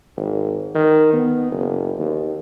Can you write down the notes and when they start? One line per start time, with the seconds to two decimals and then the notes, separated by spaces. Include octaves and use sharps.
0.16 G#1
0.75 D#3
1.13 B3
1.51 F#1
1.98 D#2